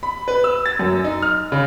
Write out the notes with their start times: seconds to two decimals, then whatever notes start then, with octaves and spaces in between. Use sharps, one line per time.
0.03 B5
0.28 B4
0.44 E6
0.66 A6
0.79 F#2
1.04 D#4
1.22 F6
1.52 C#3